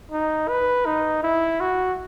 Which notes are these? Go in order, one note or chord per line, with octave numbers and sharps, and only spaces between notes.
D#4
B4
D#4
E4
F#4